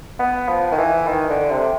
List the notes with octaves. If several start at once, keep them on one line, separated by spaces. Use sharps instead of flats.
B3
F3
D#3
E3
D#3
D3
C3